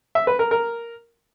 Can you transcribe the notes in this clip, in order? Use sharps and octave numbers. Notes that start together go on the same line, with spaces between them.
E5
B4
A#4
A#4